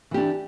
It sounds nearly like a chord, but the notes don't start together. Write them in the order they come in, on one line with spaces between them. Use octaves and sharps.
E3 G4 D4